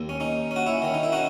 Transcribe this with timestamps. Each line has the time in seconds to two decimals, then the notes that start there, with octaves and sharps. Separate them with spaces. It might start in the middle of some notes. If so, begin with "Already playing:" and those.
Already playing: D#2
0.09 C#4
0.20 C#4 D#4
0.51 C#4
0.56 F#4
0.66 C#4 E4
0.82 D#3 C#4
0.94 D#4
1.03 E4
1.12 C#4 D#4 F#4